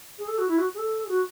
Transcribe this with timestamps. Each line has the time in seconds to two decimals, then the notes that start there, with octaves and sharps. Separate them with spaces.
0.18 G#4
0.28 A4
0.38 F#4
0.48 E4
0.58 F#4
0.74 G#4
0.78 A4
1.03 G#4
1.09 F#4